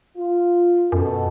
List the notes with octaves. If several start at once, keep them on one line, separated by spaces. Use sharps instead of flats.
F4
F#2 B2 A4